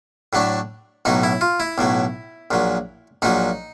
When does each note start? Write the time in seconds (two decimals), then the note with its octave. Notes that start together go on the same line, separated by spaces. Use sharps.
0.33 A2 F#3 A3 D4
1.05 B1 A2 F#3 D#4
1.23 E4
1.41 F4
1.60 E4
1.78 B1 A2 F#3
2.51 A#1 A#2 F#3
3.22 A#1 A#2 F#3 D#4